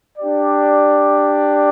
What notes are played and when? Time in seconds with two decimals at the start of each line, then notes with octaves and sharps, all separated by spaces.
0.17 D4 G4 D5